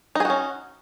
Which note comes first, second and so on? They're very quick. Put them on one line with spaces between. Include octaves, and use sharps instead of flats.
D#4 G#4 F#4 C#4